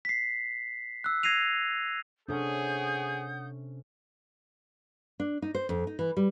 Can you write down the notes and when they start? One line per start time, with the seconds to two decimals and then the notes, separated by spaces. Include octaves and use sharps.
0.05 B6 C7
1.04 E6 F#6
1.23 G#6 A#6 C7 D#7 F7
2.28 C3 C#4 D4 G#4 A4 F#5 D#6 G6
5.20 D4
5.42 D#4
5.55 C5
5.69 F2
5.87 D#4
5.99 E3
6.17 G3